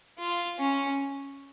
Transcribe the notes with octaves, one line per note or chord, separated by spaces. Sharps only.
F4
C#4